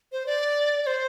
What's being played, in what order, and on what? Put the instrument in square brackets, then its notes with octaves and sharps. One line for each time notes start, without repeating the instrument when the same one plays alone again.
[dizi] C5
D5
D5
C5